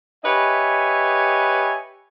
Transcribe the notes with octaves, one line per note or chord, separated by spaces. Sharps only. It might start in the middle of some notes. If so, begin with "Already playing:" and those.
G4 B4 C#5 D#5 E5 G#5